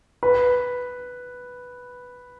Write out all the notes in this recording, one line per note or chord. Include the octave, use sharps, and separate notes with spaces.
B4